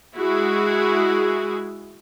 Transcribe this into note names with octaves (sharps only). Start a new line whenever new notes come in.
G#3 E4 F#4 G#4